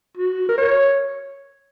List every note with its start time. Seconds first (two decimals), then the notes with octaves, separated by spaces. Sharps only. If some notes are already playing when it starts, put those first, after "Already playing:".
0.17 F#4
0.49 A#4
0.58 C#5